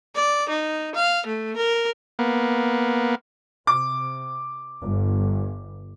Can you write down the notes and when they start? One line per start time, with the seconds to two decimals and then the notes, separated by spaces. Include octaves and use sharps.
0.15 D5
0.49 D#4
0.95 F5
1.26 A3
1.56 A#4
2.19 A#3 B3
3.67 C3 D6
4.82 G1